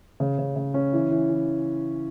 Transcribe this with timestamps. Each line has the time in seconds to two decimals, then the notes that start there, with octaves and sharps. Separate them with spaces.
0.20 C#3
0.39 C#3
0.56 C#3
0.74 C#4
0.93 E3
1.11 E3
1.29 E3